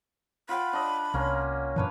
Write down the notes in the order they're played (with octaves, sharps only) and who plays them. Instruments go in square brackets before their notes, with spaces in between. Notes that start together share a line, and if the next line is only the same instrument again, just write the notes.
[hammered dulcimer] F4 F#5 G5 [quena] B5
[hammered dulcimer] D4 D#5
[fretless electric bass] C2 [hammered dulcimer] A#3 C#4 C6
[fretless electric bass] F#2 A#2 E3 [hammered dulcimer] D4 B4 C#5